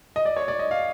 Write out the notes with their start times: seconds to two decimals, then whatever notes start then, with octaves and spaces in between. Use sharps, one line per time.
0.16 D#5
0.26 D5
0.37 C#5
0.48 D5
0.59 D#5
0.71 F5